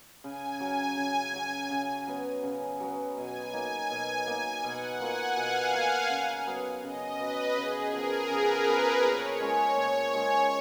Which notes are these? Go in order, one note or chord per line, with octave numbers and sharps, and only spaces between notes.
C#3 G#5
F#3 C#4
C#3
F#3 C#4
C#3
F#3 B3
C#3
F#3 B3
B2 G#5
A#3 D#4
B2
A#3 D#4
B2 F#5
A#3 F4 A#4 G#5
B2 F5
A#3 F4 A#4
C#3
F#3 B3
C#3 D#5
F#3 B3 B4
C#3 G#4
F3 B3 A#4
C#3 B4
F3 B3
A#2 C#5
G#3 C#4 G#4
A#2 C#5
G#3 C#4 G#4